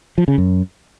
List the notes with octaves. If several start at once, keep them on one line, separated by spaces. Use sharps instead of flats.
F3
C#3
F#2